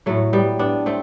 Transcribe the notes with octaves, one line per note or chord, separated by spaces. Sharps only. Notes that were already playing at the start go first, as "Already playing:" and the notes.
A2 F#3 A3
G3 B3
B3 D4
A3 C4